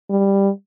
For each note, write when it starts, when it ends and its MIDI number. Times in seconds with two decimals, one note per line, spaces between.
0.10 0.50 55